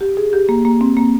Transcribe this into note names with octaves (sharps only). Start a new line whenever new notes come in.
G4
G#4
G4
A#3
A#3
C4
A#3